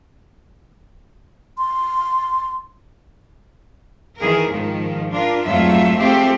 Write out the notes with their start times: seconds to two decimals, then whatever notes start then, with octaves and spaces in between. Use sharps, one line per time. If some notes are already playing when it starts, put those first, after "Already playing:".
1.58 C6
4.18 D#3 E3 G#4 A#4
4.50 G#2 D#3 F3
5.12 D4 F4 A#4
5.45 F2 G#2 F#3 A3 F4 E5
5.99 G#3 A3 C4 F4 G4